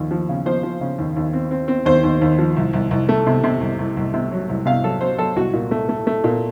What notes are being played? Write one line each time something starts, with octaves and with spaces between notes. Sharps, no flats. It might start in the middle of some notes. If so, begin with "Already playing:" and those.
Already playing: D#2 F3
F3
C#3
F3 C5
F3
C#3
D#2
D#2
C4
C4
C4
D#2 C5
D#2
D#2
F3
C2
C2
C2
A3
C3
C3
C2
C2
C2
C3
F#3
C2
C3 F5
F#3 A4
F#3 C5
F#3 A4
C2 F#4
A#2
A3
A3
A3
A#2